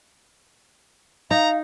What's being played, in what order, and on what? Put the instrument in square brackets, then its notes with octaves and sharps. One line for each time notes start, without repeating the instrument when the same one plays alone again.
[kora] D#4 [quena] F5 [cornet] A#5